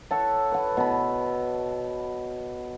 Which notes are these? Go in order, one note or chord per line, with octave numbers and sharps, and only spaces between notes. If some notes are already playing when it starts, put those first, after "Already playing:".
A4 C#5 E5 F#5
B4 F#5
B2 B5